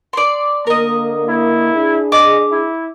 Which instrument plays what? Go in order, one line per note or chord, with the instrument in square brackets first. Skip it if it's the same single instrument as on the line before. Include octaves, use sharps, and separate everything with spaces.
[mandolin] D5 C6
[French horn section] D3 A#3 [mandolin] A#4 D#5
[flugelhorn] E4
[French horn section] D4 G#4
[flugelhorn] D#5 [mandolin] D6
[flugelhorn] E4